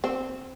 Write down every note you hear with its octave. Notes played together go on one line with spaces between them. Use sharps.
C4